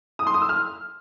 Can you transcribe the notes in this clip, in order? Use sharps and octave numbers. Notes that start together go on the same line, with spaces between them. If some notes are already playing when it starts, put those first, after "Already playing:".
D#6
C6
D#6
E6
F6